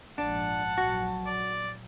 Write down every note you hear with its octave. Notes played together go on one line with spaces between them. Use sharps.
A#1 G#2 D4 F#5 A5
A#1 F#3 F#4
D5